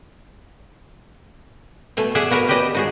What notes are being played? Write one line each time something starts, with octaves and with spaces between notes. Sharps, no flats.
B2 A3 G#5
G#4 D5 E5 F#5 G#5
B3 F#4 A#4 B4
G4 B4 D5 D#5 A5
D#4 F#4 G#4